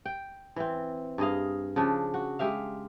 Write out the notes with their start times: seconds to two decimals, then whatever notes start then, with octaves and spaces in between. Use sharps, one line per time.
0.05 G5
0.56 E3 C4
1.18 G2 G#4 D#5 F5
1.76 C#3 F3 D4
2.14 F#4
2.39 G#3 G4 E5 F5